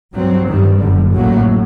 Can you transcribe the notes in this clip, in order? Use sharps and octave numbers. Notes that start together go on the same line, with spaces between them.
G2 F#3 C4
G2 D#3 G3
F#1 F#2 D3
A1 A2 F#3 A#3